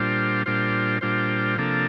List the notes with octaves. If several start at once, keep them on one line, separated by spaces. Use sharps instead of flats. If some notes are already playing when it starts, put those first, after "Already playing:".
Already playing: A#2 G3 D4 F4 C5
A#2 G3 D4 F4 C5
A#2 G3 D4 F4 C5
C3 F3 A#3 D4 A4